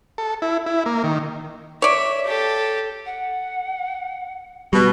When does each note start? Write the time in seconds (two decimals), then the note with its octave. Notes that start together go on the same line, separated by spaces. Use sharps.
0.18 A4
0.42 E4
0.66 E4
0.86 A#3
1.04 D#3
1.82 C#5 D5 E5
2.26 G4 A4
3.06 F#5
4.73 B2 G3